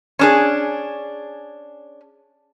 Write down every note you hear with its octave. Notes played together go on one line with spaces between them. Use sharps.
C#4 D4 G#4